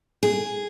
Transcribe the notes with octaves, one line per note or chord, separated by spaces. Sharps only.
G#4